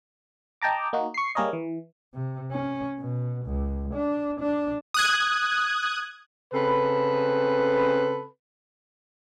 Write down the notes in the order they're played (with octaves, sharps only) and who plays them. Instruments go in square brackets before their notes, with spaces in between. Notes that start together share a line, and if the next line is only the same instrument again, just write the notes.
[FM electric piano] D#5 G5 A5 A#5 D6
A#3 D#4 F#4
C#6 C7
G3 A#3 G#4 A#4 C#5 D#5
E3
[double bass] C3
C#4
B2
C#2
D4
D4
[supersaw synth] D#6 F#6 G#6
[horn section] C#3 C4 A4 B4